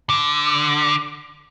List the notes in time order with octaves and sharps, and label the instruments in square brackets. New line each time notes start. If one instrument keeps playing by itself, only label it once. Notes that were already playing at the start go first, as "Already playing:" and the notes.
[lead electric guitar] D3